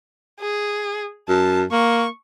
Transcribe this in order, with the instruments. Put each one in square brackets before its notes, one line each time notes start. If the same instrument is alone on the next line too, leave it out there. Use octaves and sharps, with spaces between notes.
[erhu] G#4
[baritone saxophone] F#2 [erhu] A5
[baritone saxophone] A#3 [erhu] C#6